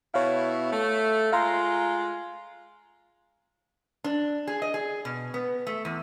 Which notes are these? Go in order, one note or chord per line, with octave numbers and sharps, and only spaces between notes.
B2 E4 C#5 F5
A3
G#3 F4 F5 A#5 C6
D4
G#4
D#5
G#4
B2
B3
A3
E2